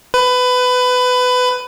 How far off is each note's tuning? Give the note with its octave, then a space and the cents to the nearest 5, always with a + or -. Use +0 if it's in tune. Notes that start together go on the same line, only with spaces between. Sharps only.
B4 +20